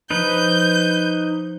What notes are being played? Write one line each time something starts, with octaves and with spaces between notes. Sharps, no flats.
F3 D#4 B4 G6